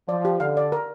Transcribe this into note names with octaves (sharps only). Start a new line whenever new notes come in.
F3 D5
G4
D3 F5
D5
A#4